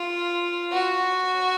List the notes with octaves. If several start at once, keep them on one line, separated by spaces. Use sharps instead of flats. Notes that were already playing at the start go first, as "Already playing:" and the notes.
Already playing: F4
F#4